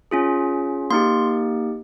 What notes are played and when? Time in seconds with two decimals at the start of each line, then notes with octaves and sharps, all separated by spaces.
0.11 C#4 F4 G#4
0.90 A#3 D#4 G4 C6